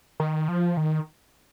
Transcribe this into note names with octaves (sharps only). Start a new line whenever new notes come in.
D#3
F3
D#3